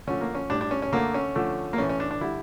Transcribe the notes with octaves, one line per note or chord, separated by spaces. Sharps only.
D3 F3 A3 C#4
A#3
C#4
A2 G3 D4
D4
C#4
C#4
D3 A3 A#3
C#4
D3 F3 A3
A#3
A2 E3 A3 C#4
C#4
D4
D4
D3 G3 E4